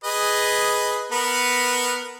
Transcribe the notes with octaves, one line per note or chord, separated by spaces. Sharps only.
G#4 B4 D#5
B3 A#4 B4